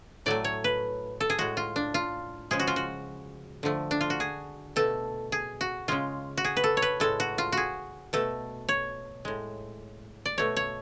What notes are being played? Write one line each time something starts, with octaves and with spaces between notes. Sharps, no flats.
A2 F#3 A3 D5
C#5
B4
A4
G#4
A2 G#3 F#4
F4
D4
F4
C#3 F3 G#3 G#4
F#4
F4
F#4
D3 F3 A3
D4
F4
F#4
G#4
B2 A3 A4
G#4
F#4
C#3 G#3 F4
F#4
G#4
B4
A4
C#5
B4
A2 G#3 A4
F#4
F4
F#4 G#4
B2 A3 A4
C#5
A2 G#3
D5
B2 A3 C#5
C#5